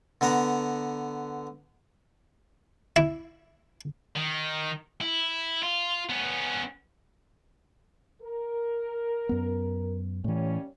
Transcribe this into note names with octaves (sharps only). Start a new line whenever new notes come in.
D3 B3 F#5 A#5
E4
D#3
E4
F4
B3 C#4
A#4
F#2 B3
D#2 A2 E3 G3 C#4